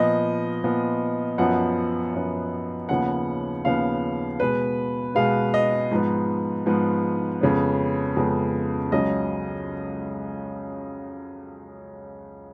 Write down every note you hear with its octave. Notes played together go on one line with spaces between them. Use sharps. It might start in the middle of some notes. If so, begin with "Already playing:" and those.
Already playing: A#2 F3 B3 D#5
A#2 F3 B3
F#2 F3 B3 F#5
F#2 F3 B3
D#2 C#3 F3 B3 F#5
D#2 C#3 F3 B3 F5
B2 G#3 B3 B4
B2 G#3 B3 F5
D#5
G#2 F3 B3
G#2 F3 B3
F2 C#3 G#3 B3
F2 C#3 G#3 B3
C#2 C#3 F#3 D#5